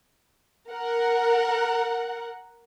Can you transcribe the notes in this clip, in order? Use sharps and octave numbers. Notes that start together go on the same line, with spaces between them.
A#4 F#5